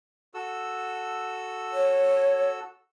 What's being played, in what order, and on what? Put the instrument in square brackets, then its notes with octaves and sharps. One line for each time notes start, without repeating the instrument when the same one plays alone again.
[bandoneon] F#4 A4 E6
[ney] C#5